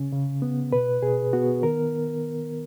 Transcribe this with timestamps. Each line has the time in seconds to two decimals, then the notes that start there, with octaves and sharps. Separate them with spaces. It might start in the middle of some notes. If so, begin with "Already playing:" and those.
Already playing: C#3 C#4
0.12 C#3
0.42 B3
0.73 B2 B4
1.02 B2 G#4
1.33 B3 F#4
1.63 D#3 A#4